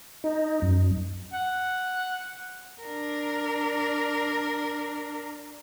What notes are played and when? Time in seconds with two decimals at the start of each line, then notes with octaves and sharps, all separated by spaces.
0.24 D#4
0.62 F#2
1.33 F#5
2.82 D4 A#4